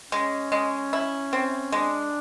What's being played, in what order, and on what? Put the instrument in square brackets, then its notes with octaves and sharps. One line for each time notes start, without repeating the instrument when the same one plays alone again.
[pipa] G#3 [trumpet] C#4
[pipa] G#3
E4
C4
[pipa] G#3 [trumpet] D4